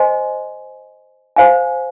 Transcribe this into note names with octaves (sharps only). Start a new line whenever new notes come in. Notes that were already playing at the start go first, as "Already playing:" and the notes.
Already playing: C5 D#5 G#5 C6
C5 F5 G#5